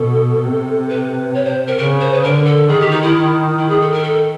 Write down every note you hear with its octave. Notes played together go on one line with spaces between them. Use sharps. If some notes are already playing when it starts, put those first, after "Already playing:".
Already playing: B2 A4
C3
B4
C#5
C5
A#4
C#3 A#4
C5
B4
D3 A#4
A4
D#3 G#4
G4
D#4
E4
E4
G#4
A4
A#4
A4